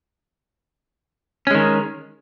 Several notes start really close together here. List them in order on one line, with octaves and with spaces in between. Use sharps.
C#4 G#3 D#3